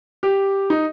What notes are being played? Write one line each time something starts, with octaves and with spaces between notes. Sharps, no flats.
G4
D#4